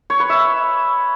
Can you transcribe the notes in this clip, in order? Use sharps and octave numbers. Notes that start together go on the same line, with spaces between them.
C#5
B4
E5